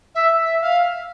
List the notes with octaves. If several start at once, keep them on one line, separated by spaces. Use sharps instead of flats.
E5
E5
F5